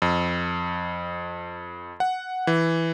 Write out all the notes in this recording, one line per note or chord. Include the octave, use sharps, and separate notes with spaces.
F2
F#5
E3